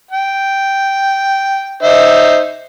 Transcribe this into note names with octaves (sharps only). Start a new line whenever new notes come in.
G5
D#4 C5 E5